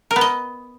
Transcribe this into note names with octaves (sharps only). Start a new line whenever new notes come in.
A#4
B3
D#5